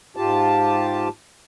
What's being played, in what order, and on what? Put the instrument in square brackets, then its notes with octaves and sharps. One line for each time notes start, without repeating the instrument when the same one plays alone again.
[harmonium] G#2 F4 G4 A5